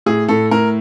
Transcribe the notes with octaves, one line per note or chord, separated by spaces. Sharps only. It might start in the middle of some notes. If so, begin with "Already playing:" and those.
A2 G#4
A2 A4
A2 A#4